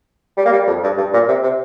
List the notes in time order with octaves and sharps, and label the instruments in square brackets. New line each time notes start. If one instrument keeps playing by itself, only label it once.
[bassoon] G3
A#3
G3
F2
G2
G2
A#2
C3
C3